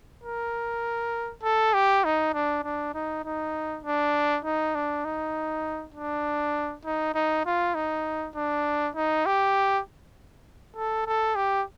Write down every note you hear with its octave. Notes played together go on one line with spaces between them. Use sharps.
A#4
A4
G4
D#4
D4
D4
D#4
D#4
D4
D#4
D4
D#4
D4
D#4
D#4
F4
D#4
D4
D#4
G4
A4
A4
G4